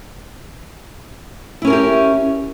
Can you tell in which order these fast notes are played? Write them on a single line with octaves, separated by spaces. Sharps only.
E4 C#4 A#4 G#4 G4